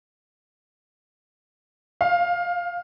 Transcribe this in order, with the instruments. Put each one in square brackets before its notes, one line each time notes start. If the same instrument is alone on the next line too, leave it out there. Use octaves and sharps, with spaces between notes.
[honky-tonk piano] F5